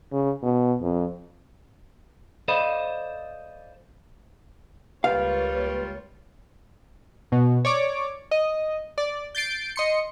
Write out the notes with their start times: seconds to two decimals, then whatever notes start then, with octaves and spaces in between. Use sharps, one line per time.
0.12 C#3
0.43 B2
0.82 F2
2.48 A4 C5 D5 D#5 F5 B5
5.04 C#2 G3 A#3 F4 B4 C#5 F5
7.32 B2
7.65 C#5 D5 D6
8.31 D#5
8.98 D5
9.35 G6 A6 C7 D7
9.76 D#5 C6 C#7